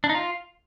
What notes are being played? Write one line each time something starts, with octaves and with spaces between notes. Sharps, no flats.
D4
D#4
F4